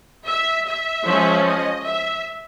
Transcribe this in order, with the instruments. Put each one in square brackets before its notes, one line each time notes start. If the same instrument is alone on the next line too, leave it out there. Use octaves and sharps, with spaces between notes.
[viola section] E5
E5
F3 G#3 C#4
D#5
E5